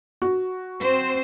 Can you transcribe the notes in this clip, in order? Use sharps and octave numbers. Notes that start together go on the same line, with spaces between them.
F#4
C4 C5